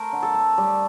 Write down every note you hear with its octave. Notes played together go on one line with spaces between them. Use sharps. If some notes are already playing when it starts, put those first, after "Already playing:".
Already playing: A3 A#4 C5
D3
A4
A3
G3